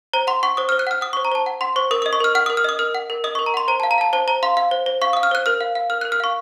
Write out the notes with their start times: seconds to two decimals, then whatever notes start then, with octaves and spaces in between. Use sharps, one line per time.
0.13 C5 A#5
0.27 F#5 C6
0.43 F#5 C#6
0.57 C5 D#6
0.69 C5 F6
0.79 F#6
0.87 F#5 F6
1.01 F#5 D#6
1.13 C5 C#6
1.25 A#5
1.32 C5 A5
1.46 F#5
1.61 F#5 C6
1.76 C5 C#6
1.91 A#4 D#6
2.02 D#5 D#6
2.13 C#6
2.20 A#4 F6
2.35 F#5 F6
2.46 A#4 D#6
2.57 F6
2.64 D#5 D#6
2.79 A#4 F6
2.95 F#5
3.10 A#4
3.24 D#5 D#6
3.35 A#4 C#6
3.46 A#5
3.54 F#5 C6
3.68 C5 A#5
3.80 F5 A5
3.91 A#5
3.98 F5 A5
4.13 C5 A5
4.28 C5 A#5
4.43 F5 C6
4.57 F5
4.71 C5
4.86 C5
5.02 F5 C#6
5.13 F5 D#6
5.23 F6
5.31 C5 F#6
5.46 A#4 F6
5.61 F5
5.75 F5
5.90 A#4 F6
6.01 A#4 F#6
6.12 F6
6.20 F5 C#6